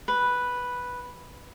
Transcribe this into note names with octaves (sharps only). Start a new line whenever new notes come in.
B4